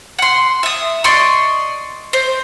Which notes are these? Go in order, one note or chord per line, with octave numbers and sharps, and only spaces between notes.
F#5 C6
E5 D#6
D5 D#5 C6 C#6
C5